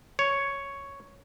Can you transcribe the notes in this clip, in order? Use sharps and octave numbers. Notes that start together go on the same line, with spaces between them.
C#5